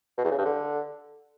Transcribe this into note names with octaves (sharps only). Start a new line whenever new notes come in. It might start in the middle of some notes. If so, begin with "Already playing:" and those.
B2
E2
C#3
G2
D3